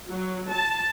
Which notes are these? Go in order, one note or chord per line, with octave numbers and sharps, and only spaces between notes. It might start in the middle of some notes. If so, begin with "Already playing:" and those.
F#3
A5